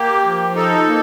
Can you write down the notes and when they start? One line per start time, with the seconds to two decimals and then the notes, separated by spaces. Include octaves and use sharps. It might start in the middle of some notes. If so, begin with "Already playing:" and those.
Already playing: A#3 G4
0.24 F3
0.55 D#4 A4
0.87 A#3